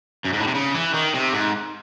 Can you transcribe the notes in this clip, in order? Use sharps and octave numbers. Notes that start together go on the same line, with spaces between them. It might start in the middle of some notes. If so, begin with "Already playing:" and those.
F#2
G#2
A2
C3
C#3
E3
D#3
C3
G#2